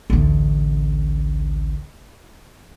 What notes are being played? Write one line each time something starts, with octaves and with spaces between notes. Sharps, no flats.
A1 D2